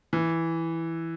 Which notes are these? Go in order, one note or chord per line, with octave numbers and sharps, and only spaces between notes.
E3